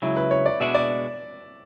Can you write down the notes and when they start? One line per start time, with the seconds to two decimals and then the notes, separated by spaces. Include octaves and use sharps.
0.02 C#2 C#3 F#3 E4
0.17 B4
0.31 C#5
0.46 D5
0.60 B2 G#3 D4 F#4 E5
0.74 D5